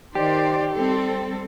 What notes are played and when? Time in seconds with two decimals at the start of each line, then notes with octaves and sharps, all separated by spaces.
0.15 D#3 G4 C5 D5
0.75 G3 C4 A4